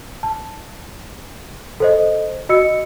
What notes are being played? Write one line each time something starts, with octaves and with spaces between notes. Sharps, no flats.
A5
A4 C5 D#5
F#4 D#5 E6 C#7